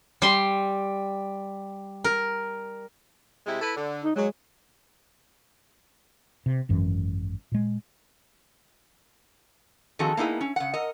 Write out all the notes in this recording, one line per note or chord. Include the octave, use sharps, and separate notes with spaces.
G3 C6
A#4
C3 G#3 E4
E4 A4 B4
D3
D#4
F#3 G#3
C3
G#1 F#2 E3
A#2 G#3
D#3 F3 C4 F#4 G#4 A4
A#3 B3 D#4 E4 G#4
C#4
C#3 F#5
A#4 D#5